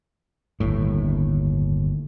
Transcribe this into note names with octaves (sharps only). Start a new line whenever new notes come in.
G1 D#2 A2